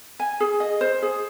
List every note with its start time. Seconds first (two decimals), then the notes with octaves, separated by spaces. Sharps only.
0.19 G#5
0.40 G#4
0.60 D#5
0.81 C5
1.02 G#4